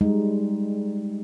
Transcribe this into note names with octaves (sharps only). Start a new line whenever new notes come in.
G3 G#3 D#4